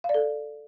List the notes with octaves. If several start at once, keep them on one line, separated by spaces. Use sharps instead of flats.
F5
D5
A4